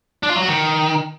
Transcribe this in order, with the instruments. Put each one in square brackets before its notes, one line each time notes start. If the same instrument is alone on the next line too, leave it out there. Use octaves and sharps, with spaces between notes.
[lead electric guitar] D4
F4
F#3
F#4
D#3